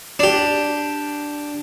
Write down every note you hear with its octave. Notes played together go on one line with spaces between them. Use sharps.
D4 G4